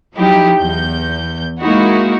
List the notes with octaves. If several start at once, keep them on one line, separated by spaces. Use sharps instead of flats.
F3 F#3 D#4 E4 G4
E2 G6
G#3 A#3 D#4 E4 F#4